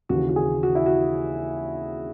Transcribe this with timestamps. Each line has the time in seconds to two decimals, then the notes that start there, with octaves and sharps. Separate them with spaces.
0.09 D#2 C#3 E3 F#4
0.29 F#4
0.36 G#4
0.63 F#4
0.75 E4
0.86 F#4